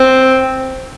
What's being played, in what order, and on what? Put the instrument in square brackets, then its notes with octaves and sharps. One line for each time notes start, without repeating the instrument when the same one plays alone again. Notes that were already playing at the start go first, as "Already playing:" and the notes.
Already playing: [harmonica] C4